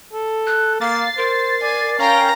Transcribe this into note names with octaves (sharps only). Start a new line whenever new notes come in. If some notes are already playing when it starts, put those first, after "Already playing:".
A4
F#6
A#3 F5 A6 C7
A#4 C5
D5 G#5
C#4 F5 G5 A#5